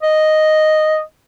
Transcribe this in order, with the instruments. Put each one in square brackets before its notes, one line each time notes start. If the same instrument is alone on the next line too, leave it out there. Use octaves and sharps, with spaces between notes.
[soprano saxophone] D#5